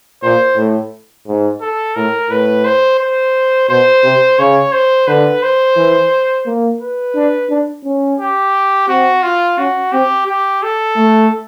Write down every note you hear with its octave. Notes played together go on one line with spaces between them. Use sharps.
A#2 C5
A2
G#2
A4
A2 A#4
A2 B4
C5
C5
B2 C5
C3
C#3 C#5
C5
D3 B4
C5
E3
A#3
B4
D4
D4
C#4
G4
C4 F#4
F4
C#4 F#4
C4 G4
G4
A4
A3